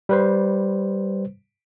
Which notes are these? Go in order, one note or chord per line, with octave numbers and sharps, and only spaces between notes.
G3 B4 C5